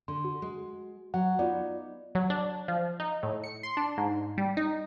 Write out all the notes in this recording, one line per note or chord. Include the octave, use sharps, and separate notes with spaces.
D3 C6
F#4
G#3
F#3 F#5
B3 D#4 F4 D5
F#3
D4
F3
D#4
A2
C#7
C6
D4
G#2
G3
D#4